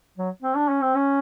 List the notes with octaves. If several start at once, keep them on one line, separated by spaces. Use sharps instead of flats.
F#3
C4
D4
C#4
C4
C#4